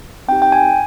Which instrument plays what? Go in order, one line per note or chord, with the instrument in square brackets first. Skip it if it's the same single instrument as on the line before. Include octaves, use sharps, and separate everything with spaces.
[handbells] C4 D#4 G4 G5
G5
G#5